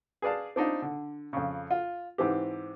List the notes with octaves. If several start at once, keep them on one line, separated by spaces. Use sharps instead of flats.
G#4 B4 D5 F5 A5
C4 D4 D#4 F4
D3
F2 C#3
F4
G#2 E3 C4 G4